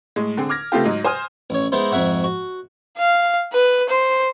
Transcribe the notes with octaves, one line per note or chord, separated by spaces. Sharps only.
A2 G#3
D3 C4 G#4
D6 F6 G#6 A#6
C#3 A3 B3 C4 F4 G4
G#2 F#3 D#4
C5 G#5 D#6 F6 G6
A1 C#5
G#3 B3 D#4 E4 C5
F2 G#2 E5 F#5 C#6
F#4
F5
B4
C5